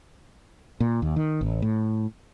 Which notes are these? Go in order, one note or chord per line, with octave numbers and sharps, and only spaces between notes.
A#2
D#2
D#3
A1
A2